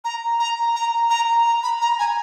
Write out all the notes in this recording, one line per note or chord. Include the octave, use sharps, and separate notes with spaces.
A#5
A#5
A#5
A#5
A#5
B5
A#5
G#5